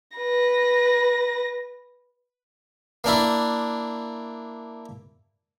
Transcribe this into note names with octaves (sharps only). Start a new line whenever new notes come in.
B4 A#6
A#3 D4 E4